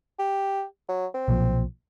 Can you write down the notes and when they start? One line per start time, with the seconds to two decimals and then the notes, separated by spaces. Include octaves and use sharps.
0.19 G4
0.89 F#3
1.14 C4
1.28 B1 A#2 F3